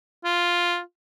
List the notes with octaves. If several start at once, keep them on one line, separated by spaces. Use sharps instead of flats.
F4